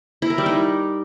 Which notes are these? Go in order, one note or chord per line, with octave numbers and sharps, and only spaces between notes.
E4
A#4
G3
D#4